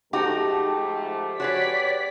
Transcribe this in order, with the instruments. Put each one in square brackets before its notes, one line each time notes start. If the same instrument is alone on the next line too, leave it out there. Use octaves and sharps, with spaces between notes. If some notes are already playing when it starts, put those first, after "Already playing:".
[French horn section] G#2 F3 A3 [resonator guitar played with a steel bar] D#4 F#4 [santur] G4 A5
[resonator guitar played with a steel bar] F#4 G#4 B4 [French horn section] C#5 [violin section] D5 B6